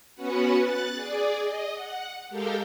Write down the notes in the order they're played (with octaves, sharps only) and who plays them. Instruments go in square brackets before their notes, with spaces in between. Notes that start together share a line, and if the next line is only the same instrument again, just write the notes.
[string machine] B3 C#4 F#4 B4 F#5
F#6 A6
G#4 D5
D#5
F#5
G#3 G4 A4 A#4 F5 G5